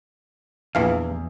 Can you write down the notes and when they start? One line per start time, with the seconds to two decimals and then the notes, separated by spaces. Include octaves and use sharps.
0.75 A#1 E2 E3 F5